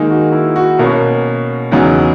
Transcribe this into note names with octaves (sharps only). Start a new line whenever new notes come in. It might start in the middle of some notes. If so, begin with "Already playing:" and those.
Already playing: D#3 G#3 A#3 D#4 G#4
F#4
E4
F#4
B2 A#3 C#4 A#4
E2 C#3 F#3 B3 D#4